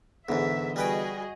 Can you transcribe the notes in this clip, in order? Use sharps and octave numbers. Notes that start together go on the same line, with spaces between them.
E2 G#2 D3 E3 B3 E5
G3 F#4 G#4 B4 D#5 G5